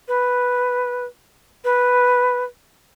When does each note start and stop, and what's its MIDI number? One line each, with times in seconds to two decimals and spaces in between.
0.08 1.05 71
1.64 2.44 71